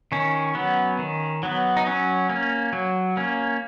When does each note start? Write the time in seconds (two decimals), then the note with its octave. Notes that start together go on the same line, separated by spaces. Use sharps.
0.12 D#3 C#4
0.55 F#3 B3
0.99 D#3
1.43 F#3 B3
1.77 D#4
1.86 F#3 C#4
2.29 A#3 C#4
2.73 F#3
3.17 A#3 C#4